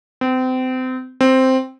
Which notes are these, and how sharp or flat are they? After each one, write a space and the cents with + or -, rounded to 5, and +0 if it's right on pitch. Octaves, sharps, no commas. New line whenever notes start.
C4 -30
C4 +0